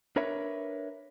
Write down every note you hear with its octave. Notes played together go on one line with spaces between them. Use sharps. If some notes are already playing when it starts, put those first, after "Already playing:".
D4 A#4 B4 C#5 E5